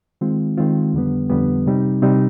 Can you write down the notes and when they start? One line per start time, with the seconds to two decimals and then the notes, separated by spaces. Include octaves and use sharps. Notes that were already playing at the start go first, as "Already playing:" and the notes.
0.21 D#3 G#3 C4 F4
0.58 D#3 G#3 C4 F4
0.93 F2 D3 G3 B3
1.30 F2 D3 G3 B3
1.66 C3 G3 C4 D#4
2.02 C3 G3 C4 D#4